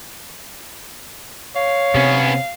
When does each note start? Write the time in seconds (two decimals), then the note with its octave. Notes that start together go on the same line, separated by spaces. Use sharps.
1.56 C#5 F5
1.95 C3 B3 C#4